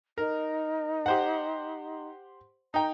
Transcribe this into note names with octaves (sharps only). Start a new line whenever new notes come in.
D#4 A#4
G4 C5 F#5
D#4 G5 A#5